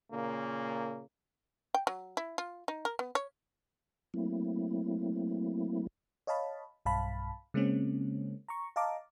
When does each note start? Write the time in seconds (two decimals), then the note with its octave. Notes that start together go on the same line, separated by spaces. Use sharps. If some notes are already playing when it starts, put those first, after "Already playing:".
0.12 A#2 C#3 A#3
1.74 G5
1.87 F#3
2.17 E4
2.38 F4
2.68 D#4
2.85 A#4
2.99 B3
3.15 C#5
4.14 F#3 A3 A#3 C4 E4
6.27 C#5 D#5 F5 A5 B5
6.86 B1 G2 F5 A5 B5
7.54 C#3 G#3 A#3 C4 C#4
8.49 A#5 C#6
8.76 D#5 F5 A5 A#5 D6